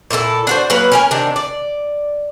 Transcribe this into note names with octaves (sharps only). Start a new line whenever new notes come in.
A#2 E4 F4 A4
D4 F#4 C5
F#3 A#3 B4
C#4 A#4 G#5
C3 D#3 D4
D5